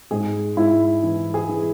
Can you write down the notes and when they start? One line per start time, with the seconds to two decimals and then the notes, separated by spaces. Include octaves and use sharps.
0.11 G#2 G#4
0.57 G#2 E4
1.03 E3
1.34 G#4
1.49 E3